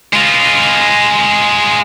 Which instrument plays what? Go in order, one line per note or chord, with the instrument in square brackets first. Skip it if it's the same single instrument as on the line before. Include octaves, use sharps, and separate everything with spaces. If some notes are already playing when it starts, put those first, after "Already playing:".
[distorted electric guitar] G#3 F4